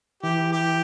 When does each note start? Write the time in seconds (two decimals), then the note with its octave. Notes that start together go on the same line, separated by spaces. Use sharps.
0.23 E3 G4
0.52 G4